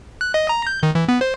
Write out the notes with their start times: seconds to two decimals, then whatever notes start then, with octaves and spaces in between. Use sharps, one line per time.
0.21 F#6
0.34 D#5
0.49 A#5
0.67 G6
0.83 D#3
0.95 E3
1.08 B3
1.21 C5